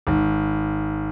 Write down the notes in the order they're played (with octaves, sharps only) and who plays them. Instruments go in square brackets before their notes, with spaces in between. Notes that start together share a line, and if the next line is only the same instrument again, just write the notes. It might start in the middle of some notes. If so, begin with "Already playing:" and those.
[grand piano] G#1